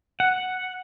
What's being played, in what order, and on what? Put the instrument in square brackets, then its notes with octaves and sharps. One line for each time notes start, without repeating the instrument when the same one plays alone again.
[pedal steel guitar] F#5